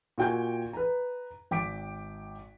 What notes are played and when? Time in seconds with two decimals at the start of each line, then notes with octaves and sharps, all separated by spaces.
0.18 A#2 F#4 G5 G#5 G6
0.73 B4 A#5
1.51 G#1 G5 D6 B6 D7